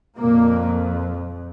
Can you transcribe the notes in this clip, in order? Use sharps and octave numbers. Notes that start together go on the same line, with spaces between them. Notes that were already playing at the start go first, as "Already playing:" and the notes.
F2 A#2 A#3